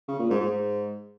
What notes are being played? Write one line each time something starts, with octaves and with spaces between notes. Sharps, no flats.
C#3
A#2
G#2
G#2